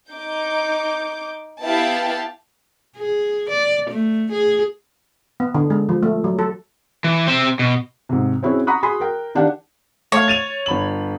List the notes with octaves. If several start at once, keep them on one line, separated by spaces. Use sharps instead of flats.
D#4 D6 G6
B3 E4 G4 F5 G5 A5
G#4
D5
A3
G#4
B3
D3
G#3
F3
A3
F#3
A4
E3
C4 E5
B2
G#2 C3
C4 C#4 E4 F#4 G#4 C#5
F#5 A#5 B5 C#6 D#6 F#6
F#4 G#4 G#5 B5 C6 D#6
A#4 G5
D#3 D4 G4 F5 F#5
A3 C#5 F5
A6 D#7 F7
G1 B5 F#7